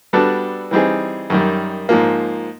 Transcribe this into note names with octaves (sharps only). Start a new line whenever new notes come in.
G3 B3 D4 F#4 A4
E3 G3 C4 D#4 G#4
F#2 D#3 G3
G#2 F3 A#3